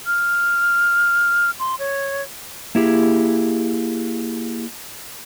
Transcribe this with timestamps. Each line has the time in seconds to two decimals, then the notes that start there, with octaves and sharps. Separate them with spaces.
0.06 F6
1.60 C6
1.79 C#5
2.75 A#3 E4 G4 G#4